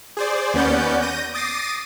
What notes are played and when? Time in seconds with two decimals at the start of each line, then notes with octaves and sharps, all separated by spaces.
0.17 G#4 C5 D5
0.54 D#2 B3 C#4 D5 F#5 G6
1.01 G6 A#6 D#7
1.34 D6 D#6 A6 A#6 C7 D#7